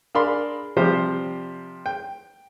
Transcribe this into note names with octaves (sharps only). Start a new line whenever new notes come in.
D4 G#4 A#4 F5 B5 C6
C3 F3 G3 G4 C5
G5